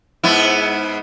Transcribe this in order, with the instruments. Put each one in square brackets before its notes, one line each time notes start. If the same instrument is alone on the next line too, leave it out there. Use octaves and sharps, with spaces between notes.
[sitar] G#2 B3 E4